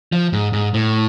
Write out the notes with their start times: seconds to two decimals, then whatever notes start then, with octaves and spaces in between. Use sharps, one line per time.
0.12 F3
0.33 G#2
0.53 G#2
0.74 A2